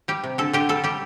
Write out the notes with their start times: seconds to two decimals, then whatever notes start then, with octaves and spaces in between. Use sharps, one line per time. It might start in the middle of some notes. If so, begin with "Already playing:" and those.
0.08 G3 G4
0.24 C3
0.38 D3 A4
0.53 D3 G4
0.69 G3 A4
0.84 G3 G4